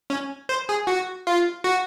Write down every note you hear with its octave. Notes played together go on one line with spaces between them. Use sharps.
C#4
C5
G#4
F#4
F4
F#4